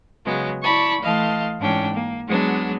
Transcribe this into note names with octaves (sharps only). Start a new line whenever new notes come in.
C#3 F#3 G#3 B3
E4 D5 A5 B5 C#6
E3 A3 D#5 F5 A5 C6
G#2 E3 C#4 D4 G5
A#3
F#3 G#3 B3 D4